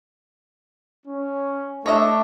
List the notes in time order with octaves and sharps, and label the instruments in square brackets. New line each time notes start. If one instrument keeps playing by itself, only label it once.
[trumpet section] C#4
[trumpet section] A3 D4 [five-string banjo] C#5 D#5 E5